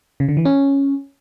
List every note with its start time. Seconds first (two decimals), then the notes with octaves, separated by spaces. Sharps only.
0.20 C#3
0.28 D3
0.37 E3
0.45 C#4